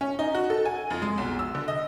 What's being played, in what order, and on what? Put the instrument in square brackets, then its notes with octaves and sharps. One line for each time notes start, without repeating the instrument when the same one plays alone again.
[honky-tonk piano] C#4
D#4
F#4
A4
G#5
F2
G#3
B1
E6
D3
D#5